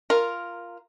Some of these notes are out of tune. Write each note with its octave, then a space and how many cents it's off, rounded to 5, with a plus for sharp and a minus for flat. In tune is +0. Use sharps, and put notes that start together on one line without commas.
F4 -5 A#4 +0